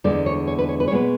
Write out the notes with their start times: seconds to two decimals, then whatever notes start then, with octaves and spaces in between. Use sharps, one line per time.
0.04 E2 D3 G#3 B3 D5
0.26 C#5
0.47 C#5
0.58 B4
0.69 C#5
0.80 B4
0.88 C#5
0.91 B2 G#3 B3 B4